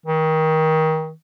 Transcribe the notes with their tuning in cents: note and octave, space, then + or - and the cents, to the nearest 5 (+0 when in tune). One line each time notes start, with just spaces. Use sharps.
D#3 +25